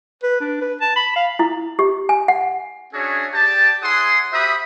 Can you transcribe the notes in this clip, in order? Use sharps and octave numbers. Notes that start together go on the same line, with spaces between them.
B4
D4
B4
A5
B5
F5
E4
G4
G#5
F#5
C#4 D4 F#4 G#4 C#5 E5
G4 D5 G5 A5
E4 G#4 C#5 F#5 C6 D#6
F#4 G4 C5 E5 B5 D#6